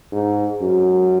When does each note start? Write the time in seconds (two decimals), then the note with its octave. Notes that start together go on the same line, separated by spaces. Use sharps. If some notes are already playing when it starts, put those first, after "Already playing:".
0.12 G#2
0.61 F#2